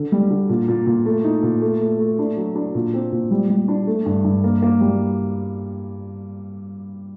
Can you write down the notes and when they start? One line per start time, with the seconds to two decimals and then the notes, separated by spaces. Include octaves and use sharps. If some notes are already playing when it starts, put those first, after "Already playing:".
Already playing: D3
0.12 G3
0.30 D3
0.49 A#2
0.68 A#2
0.87 A#2
1.06 A3
1.24 D#4
1.43 A#2
1.61 A3
1.80 A3
1.99 A3
2.19 D4
2.37 F#3
2.55 D4
2.75 A#2
2.94 C4
3.12 A#2
3.31 G3
3.49 G3
3.68 D4
3.87 A3
4.06 G2
4.24 G2
4.44 A#3
4.62 A#3
4.80 G3